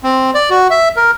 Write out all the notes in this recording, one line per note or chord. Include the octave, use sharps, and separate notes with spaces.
C4
D5
F#4
E5
A#4